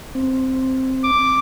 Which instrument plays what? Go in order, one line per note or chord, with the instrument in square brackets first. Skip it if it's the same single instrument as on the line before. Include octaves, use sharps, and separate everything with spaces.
[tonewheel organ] C4
[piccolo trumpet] D6